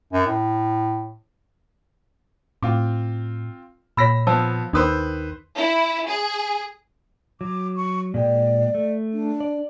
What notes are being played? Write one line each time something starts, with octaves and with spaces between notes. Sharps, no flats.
F#2
A2
A2 C4 F4 D6
A#2 C#5 B5 E6 A#6 B6
F3 B3 C5 A5 E6
D#2 D#3 D4 B4 C5 D#6 E6
E4
G#4
F#3 D6
C#6
A#2 G#3 D5 G5
A3
D4
D5